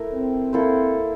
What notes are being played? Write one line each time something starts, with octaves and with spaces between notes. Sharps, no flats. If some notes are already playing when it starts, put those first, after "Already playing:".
Already playing: A3 E4 A#4
C4
A#3 E4 A4 C5